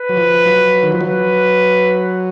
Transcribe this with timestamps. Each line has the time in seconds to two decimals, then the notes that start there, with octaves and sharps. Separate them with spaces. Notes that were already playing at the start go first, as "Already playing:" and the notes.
Already playing: B4
0.09 F#3
0.17 F3
0.45 F#3
0.83 D#3
0.92 F3
1.01 F#3 B4